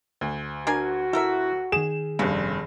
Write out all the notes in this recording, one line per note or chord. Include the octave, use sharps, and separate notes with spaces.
D2
D4 F#4 A#4 G#5
E4 A4 A#4 E5
D#3 G#4 E7
F1 G2 C#3